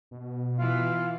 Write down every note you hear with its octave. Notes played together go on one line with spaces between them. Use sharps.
B2
E3 F4 F5